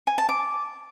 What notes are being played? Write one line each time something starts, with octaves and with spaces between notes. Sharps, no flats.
G#5
A5
D6